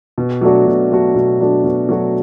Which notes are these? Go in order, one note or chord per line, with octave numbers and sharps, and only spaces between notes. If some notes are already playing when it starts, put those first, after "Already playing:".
B2
F#3 A3 D4 F#4
B2
F#3 A3 D4 F#4
B2
F#3 A3 D4 F#4
B2
F#3 A3 D4 F#4